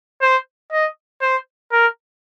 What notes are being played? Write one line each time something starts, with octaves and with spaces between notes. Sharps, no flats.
C5
D#5
C5
A#4